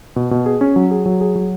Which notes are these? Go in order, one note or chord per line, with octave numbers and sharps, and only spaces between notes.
B2
B2
G#4
C#4
F#3
G#4
F#3
G#4
F#3